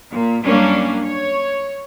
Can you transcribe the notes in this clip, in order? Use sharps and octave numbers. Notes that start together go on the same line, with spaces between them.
A#2
F#2 G3 A#3 C#4 D4
C#5